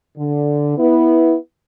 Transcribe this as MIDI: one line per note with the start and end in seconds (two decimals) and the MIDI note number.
0.17 0.77 50
0.78 1.35 59
0.78 1.35 64